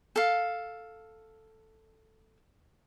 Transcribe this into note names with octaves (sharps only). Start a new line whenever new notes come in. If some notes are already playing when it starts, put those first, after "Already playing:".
A4 F5